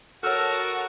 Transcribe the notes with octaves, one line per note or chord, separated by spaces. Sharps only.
F#4 A4 A#4 C#5 F#5 A5 E6 F6